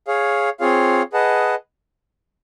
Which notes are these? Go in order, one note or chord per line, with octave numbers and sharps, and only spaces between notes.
G#4 C#5 F5
C4 F4 G#4 C#5 F5
G#4 B4 D#5 F#5 A5